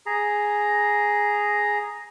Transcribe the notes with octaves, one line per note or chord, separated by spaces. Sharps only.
G#4 A#5